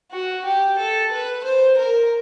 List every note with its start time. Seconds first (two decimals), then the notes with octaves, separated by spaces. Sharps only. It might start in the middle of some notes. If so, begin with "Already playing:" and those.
0.11 F#4
0.45 G4
0.78 A4
1.12 B4
1.44 C5
1.78 A#4